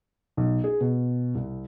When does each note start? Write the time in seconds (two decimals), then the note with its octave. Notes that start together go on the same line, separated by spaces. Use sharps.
0.37 B1
0.64 G#4
0.81 B2
1.35 C2